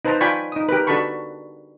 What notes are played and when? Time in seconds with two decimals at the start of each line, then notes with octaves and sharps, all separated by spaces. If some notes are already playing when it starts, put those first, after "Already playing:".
0.05 D#4 B4 C5 A5 A#5
0.21 F4 D5 G5 G#5 B5 C#6
0.52 D#4 D#6
0.69 G4 A#4 B4
0.87 D4 F#4 A4 A5 B5 C#6